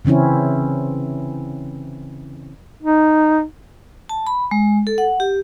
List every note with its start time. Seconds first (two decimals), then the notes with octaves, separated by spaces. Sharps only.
0.05 C#3 E3 C4 C#4 E4
2.83 D#4
4.09 A5
4.27 B5
4.51 G#3
4.87 A4
4.98 F#5
5.20 G4